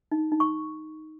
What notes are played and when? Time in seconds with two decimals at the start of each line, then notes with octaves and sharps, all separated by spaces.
0.12 D#4
0.32 D#4
0.40 C#6